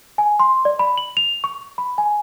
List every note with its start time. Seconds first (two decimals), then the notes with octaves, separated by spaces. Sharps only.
0.18 G#5
0.40 C6
0.65 D5
0.79 B5
0.98 F#7
1.17 F7
1.44 C#6
1.78 B5
1.98 G#5